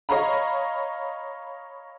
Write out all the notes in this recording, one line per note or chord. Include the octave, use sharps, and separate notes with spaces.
C#5 D#5 F5 A#5 B5